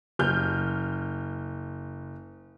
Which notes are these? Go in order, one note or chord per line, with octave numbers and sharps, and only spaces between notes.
F#1 F6 G6